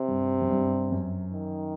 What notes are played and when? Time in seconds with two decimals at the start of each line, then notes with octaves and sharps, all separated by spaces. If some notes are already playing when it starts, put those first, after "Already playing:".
Already playing: C3
0.08 G2
0.41 F#2
0.50 G2
0.92 F#2
1.33 D#3